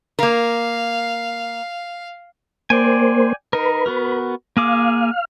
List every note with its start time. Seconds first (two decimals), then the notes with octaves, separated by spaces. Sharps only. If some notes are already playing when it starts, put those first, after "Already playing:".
0.19 A#3 A#4 F5
2.70 A#3 C5 D5 G5 G#5
3.53 D#4 A#4 B4
3.86 B3 F#4 A#4
4.57 A#3 G#4 F5 D6